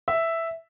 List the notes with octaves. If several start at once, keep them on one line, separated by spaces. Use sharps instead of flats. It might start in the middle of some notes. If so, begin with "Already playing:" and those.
E5